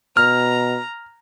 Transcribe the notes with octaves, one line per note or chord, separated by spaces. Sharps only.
B2 A#5 F6